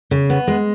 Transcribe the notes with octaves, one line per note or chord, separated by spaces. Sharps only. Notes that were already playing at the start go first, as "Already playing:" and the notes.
C#3
B3
G#3